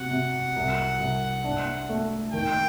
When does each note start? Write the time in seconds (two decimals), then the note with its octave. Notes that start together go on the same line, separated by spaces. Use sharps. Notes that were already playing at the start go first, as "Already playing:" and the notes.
Already playing: C3 F#4 F#5
0.11 C3
0.56 C2
1.00 C2
1.44 D4
1.89 A3
2.33 D#3 G5